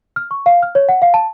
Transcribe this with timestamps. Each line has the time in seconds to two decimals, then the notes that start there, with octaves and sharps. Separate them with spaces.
0.16 F6
0.31 C#6
0.46 F5
0.63 F6
0.75 C#5
0.89 F#5
1.02 F5
1.14 A5